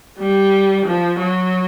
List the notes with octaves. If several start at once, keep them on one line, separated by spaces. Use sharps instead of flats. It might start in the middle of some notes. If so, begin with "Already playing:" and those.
G3
F3
F#3